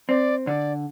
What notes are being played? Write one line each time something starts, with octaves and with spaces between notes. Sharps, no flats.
C4 D5
D3 D5